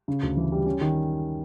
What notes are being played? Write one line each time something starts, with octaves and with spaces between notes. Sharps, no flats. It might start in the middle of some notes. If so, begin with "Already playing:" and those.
C#3
D2
E3
G3
C#4
D#3